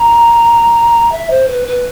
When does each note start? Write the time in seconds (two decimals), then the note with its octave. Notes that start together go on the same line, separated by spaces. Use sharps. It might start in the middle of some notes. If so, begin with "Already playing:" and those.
Already playing: A#5
1.12 E5
1.30 C5
1.48 B4
1.67 B4